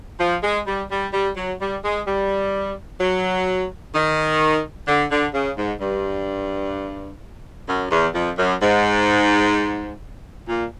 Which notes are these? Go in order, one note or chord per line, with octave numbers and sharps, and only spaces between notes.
F3
G#3
G3
G3
G3
F#3
G3
G#3
G3
F#3
D#3
D3
D3
C#3
G#2
G2
F#2
E2
F2
F#2
G#2
A#2